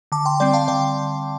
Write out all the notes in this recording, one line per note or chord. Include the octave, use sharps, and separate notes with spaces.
D3 A5 D6
G5 C6
G3 C4 D5 G5
F5 A5
D3 D5 G5